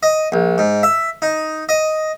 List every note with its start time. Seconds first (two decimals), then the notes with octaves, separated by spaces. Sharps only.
0.03 D#5
0.32 A#1
0.58 G#2
0.83 E5
1.22 D#4
1.69 D#5